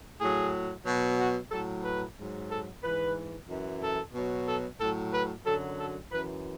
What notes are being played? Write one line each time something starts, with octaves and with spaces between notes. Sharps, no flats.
A2 F#3 G#4
B2 F#3
F#4
A2 F#3 A4
B4
G#2 F#3
A4
G#2 E3 B4
F#2 E3
A4
B2 F#3
A4
A2 F#3 A4
B4
F#2 D3 F#3 A4
A4
F#2 E3 B4